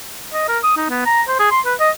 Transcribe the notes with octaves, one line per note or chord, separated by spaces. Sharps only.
D#5
A#4
D#6
D#4
B3
A#5
C5
G#4
C6
B4
D#5